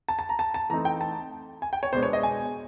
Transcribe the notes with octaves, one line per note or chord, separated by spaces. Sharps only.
A5
A5
A#5
A5
A5
E3 A3 C4 D#4 A#5
G5
A5
G#5
G5
C#5
B2 G#3 B3 D4 C5
C#5
D#5
G#5